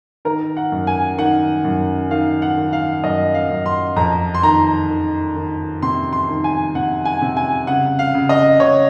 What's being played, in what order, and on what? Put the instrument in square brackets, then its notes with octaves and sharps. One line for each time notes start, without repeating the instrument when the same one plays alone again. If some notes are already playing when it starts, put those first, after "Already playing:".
[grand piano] D#3 A#4
F#5
F#2
G#5
D#3 F#5
F#2
D#3 F5
F#5
D#3
F5
F#2 D#5
F5
F#2
C6
F2 A#5
C6
D#3 A#5
D#3
D#3
C3 C6
C6
D#3
G#5
C3 F#5
G#5
C3
G#5
C#3 F#5
F5
C#3
D#5
C#3 C#5